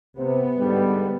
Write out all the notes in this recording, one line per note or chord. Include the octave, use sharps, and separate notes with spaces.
C3 B3
G#2 D3 G3